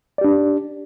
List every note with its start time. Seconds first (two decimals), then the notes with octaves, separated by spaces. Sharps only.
0.18 D5
0.21 G4
0.24 D4